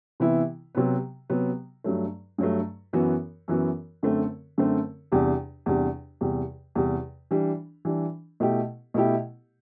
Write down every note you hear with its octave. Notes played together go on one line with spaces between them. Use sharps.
C3 E3 B3 E4
C3 F#3 B3
C3 F#3 B3
G2 F#3 A3
G2 F#3 A3
F#2 E3 B3 F#4
F#2 E3 B3 F#4
F#2 D3 A3 C4
F#2 D3 A3 C4
E2 C3 G3 D4 G4
E2 C3 G3 D4 G4
E2 C3 G3
E2 C3 G3
E3 G3 D4
E3 G3 D4
B2 A3 E4 G4
B2 A3 E4 G4